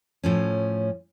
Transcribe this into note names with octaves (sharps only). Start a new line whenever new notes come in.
A2 F3 C#4